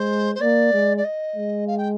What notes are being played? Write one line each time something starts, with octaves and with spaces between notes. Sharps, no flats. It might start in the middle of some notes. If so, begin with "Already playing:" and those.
Already playing: G#3 C5
C5
A#3 D5
G#3
D5
D#5
G#3
F5
G5